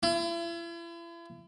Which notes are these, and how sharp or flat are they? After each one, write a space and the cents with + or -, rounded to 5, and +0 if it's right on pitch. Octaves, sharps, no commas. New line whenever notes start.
E4 +40